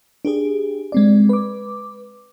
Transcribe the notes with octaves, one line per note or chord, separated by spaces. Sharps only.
D4 G4 G#4
G#3 C4 D5
B4 D6